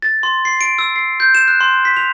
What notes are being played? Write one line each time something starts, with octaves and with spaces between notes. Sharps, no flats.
A6
C6
C7
D7
E6
C7
G6
E7
F#6
C6
B6
F7